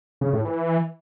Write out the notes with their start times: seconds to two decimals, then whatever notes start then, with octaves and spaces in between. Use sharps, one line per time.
0.21 C#3
0.33 A2
0.45 E3